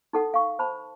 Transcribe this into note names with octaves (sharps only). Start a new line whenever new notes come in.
D#4 A4 F#5 D#6
F5 C#6
C5 A5 B5